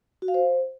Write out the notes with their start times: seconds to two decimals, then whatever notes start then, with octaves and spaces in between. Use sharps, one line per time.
0.22 F#4
0.28 F5
0.34 C5